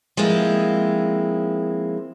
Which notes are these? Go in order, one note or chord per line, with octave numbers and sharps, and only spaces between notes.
F3 G#3 A#3 C4 E4